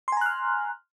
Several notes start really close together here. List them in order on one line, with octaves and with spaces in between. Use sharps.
C6 G#5 A#5 F#6 F6